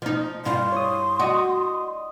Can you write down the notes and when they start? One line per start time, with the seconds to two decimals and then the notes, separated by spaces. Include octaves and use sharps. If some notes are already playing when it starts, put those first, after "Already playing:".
0.02 F3 D#4
0.45 G2 E4 F4 C6
0.72 C#5 D#6
1.19 F#4 D5 D#5 D#6